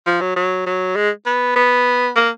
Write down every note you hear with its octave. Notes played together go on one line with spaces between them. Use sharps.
F3
F#3
F#3
F#3
G#3
B3
B3
A#3